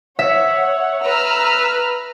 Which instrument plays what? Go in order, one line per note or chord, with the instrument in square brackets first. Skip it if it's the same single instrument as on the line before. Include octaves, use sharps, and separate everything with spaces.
[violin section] C#5 F#5 [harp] E5
[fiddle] B4 [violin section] A#5 E6 F6